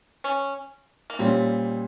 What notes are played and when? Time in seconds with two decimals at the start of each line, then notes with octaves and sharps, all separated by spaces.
0.24 C#4
1.10 A#3
1.19 A#2 G3 C4 C#4